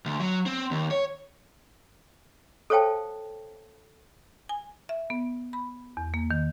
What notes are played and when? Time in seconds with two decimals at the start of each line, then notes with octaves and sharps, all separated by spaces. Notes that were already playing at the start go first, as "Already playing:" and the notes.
0.06 D2
0.20 F#3
0.46 C4
0.71 D#2
0.91 C#5
2.70 A4 C5 C#5 F5 G5 A5
4.49 G#5
4.89 E5
5.10 B3
5.53 B5
5.97 E2
6.14 A#3
6.31 D#3